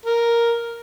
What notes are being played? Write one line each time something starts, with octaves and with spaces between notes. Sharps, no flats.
A#4